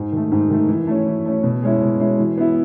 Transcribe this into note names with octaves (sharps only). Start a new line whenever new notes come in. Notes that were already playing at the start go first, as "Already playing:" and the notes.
Already playing: G#2
D#3 A3
G#2
D#3 A3
E3
A3 C#4
E3
A3 C#4
B2
G#3 C#4 E4
B2
G#3 C#4 E4
E3
B3 E4